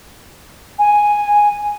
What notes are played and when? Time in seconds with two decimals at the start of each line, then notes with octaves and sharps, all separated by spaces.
0.79 G#5